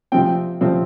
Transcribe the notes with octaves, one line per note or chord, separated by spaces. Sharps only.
C3 F3 C4 G5
C3 F3 C4